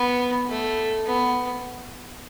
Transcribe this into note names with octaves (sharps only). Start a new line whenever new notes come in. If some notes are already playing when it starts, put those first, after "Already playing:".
Already playing: B3
A3
B3